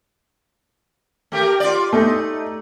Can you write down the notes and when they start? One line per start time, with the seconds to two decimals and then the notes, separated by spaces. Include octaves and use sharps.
1.32 A3 G4 A#4
1.60 F4 D5
1.93 A3 D#4